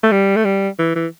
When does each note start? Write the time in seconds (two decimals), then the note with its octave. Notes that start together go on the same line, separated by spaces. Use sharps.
0.03 A3
0.12 G3
0.36 A3
0.45 G3
0.79 E3
0.96 E3